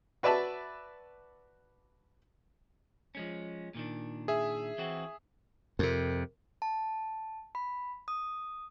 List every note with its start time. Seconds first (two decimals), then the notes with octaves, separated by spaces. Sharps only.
0.23 F#4 B4 D5 E5 A5 B5
3.15 F3 G#3 C#4
3.75 A#2 D#3 D4
4.28 G#4 E5
4.78 E3 C4 F#4
5.79 F2 C3 A#4
6.62 A5
7.55 B5
8.08 D#6